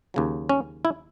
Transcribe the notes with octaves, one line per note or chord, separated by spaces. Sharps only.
D#2 C#3 F#3
C#4
E4